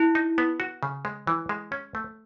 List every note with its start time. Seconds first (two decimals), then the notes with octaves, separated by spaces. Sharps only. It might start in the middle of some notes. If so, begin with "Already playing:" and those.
Already playing: E4
0.15 D#4
0.38 B3
0.60 F#4
0.83 C#3
1.05 G#3
1.27 E3
1.49 G#3
1.72 C#4
1.95 A3